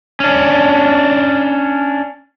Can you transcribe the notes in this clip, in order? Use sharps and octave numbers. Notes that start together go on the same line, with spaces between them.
C#4 D4